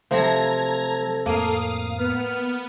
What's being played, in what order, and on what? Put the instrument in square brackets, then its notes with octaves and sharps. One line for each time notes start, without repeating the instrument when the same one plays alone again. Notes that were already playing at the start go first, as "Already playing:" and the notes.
[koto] C3 F3 [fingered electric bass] F#3 A3 [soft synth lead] A4 [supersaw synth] A#5 G#6 A#6
[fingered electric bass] F2 A2 [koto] A#3 [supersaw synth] F5 D#6
[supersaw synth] B3 [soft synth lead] F6